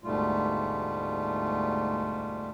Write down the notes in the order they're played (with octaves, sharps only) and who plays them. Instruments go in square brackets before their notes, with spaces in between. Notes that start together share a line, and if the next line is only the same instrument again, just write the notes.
[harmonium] D2 G#2 B2 G3 A3 F4